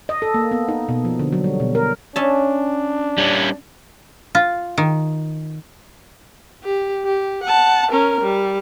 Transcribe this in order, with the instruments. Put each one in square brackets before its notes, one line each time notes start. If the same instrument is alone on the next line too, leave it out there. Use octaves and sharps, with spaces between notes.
[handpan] D#5
A4
A#3
B3
D#4
B2
F3
D3
F#3
G3
B2
A#4
[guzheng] C#4 E5 A5 [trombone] D4
[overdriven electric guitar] G3 C#4
[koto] F4
D#3
[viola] G4
G4
F#5 A5
C#4 A#4
G3